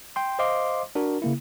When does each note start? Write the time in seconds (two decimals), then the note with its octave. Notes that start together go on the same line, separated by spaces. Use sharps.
0.16 G5 C6
0.39 C5 D#5 F5 C6 D6
0.95 D4 F#4 A#4
1.22 C#3 A#3 E4